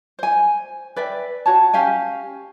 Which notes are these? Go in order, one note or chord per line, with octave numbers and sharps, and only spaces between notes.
C5 G#5
B4 D5 E5 G5
F#4 C#5 A5
C#4 G4 F5 G#5